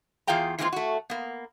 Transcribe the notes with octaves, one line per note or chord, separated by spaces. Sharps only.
E2 F4 G#4 F5 G5 A#5
E3 G#3 A#3 C4 D4 F4
A3 F#4
A#3 B3